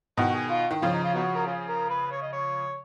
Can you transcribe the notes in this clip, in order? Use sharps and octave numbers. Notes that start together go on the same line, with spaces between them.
B2 D#3 F#4
G#4
F4
D#3
C#3 F3 F4
D#4
F4
B3 D#4 F#4
A#4
C#4 F4 G#4
A#4
B4
C#5
D#5
C#5